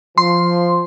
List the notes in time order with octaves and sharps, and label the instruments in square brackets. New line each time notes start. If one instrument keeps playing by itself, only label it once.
[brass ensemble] F3 [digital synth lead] C6